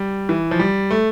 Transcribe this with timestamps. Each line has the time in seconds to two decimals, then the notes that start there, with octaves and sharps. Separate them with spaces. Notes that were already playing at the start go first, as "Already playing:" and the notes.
Already playing: G3
0.29 E3
0.51 F3
0.59 G3
0.91 A3